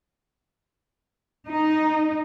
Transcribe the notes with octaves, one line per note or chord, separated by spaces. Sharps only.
D#4